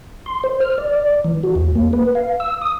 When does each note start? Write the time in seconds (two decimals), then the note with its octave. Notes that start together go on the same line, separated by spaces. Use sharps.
0.26 C6
0.44 C5
0.61 F6
0.78 D5
1.24 E3
1.43 F#4
1.55 E2
1.75 A#3
1.93 B4
2.15 F5
2.40 E6
2.62 D#6